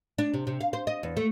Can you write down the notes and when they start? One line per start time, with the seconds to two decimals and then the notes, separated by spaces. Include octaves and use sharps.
0.18 D4
0.34 C3
0.47 C3
0.61 F5
0.73 C5
0.87 D#5
1.03 E2
1.17 A3